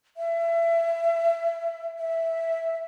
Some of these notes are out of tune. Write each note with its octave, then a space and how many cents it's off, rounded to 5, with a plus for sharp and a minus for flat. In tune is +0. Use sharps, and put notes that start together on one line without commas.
E5 +25
E5 -5